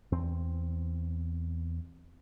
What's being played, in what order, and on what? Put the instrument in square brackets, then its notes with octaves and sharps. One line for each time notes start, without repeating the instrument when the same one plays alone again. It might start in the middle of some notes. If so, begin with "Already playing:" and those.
[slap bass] E2 C4